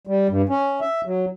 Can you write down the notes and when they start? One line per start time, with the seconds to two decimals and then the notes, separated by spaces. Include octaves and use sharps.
0.07 G3
0.29 G2
0.49 C#4
0.81 E5
1.05 F#3